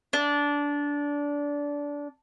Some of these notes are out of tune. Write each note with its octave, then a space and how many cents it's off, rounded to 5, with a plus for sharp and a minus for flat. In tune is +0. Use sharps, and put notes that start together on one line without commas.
D4 -20